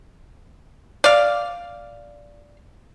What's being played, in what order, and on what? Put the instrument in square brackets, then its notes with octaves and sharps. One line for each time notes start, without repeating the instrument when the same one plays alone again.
[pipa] D5 F5